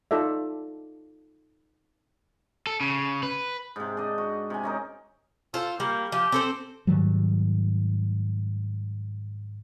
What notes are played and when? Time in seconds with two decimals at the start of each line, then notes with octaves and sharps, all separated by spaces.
0.11 D#4 F4 A4 D5 E5
2.67 A4
2.81 C#3
3.23 B4
3.76 G#2 C3
3.97 D4 D#5
4.18 F#4
4.50 C3 G#5
4.63 C#4 D#4 A#4
5.54 F4 A4 C5
5.80 G3 A#3
6.12 F3 G4
6.32 C4 A4 C5
6.87 G#2 D#3 F#3 G3